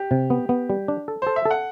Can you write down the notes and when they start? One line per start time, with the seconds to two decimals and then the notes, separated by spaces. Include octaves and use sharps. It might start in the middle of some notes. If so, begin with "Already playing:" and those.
Already playing: G4
0.11 C3
0.30 B3
0.49 B3
0.70 G3
0.88 D4
1.08 A4
1.22 A4 C5
1.36 E5
1.45 A4
1.51 F#5